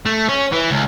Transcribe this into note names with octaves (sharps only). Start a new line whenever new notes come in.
A3
C#4
E3
C#2